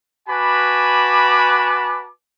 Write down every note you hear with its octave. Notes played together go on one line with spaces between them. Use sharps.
F#4 B4 G#5 A5 B5 D6